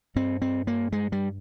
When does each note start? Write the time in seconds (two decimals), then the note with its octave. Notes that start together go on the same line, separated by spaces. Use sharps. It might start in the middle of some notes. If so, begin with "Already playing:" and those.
0.16 G2 C4
0.42 C4
0.67 A#3
0.92 G#3
1.12 G3